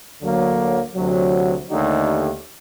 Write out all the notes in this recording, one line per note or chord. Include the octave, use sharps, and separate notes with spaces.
D2 D3 F#3 A#3
D2 C3 F#3
D#2 D3 A3 D#4 G4